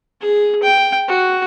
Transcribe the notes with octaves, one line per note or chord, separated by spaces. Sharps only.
G#4
G5
F#4